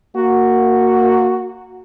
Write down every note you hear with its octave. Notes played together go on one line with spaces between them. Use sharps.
A#3 F#4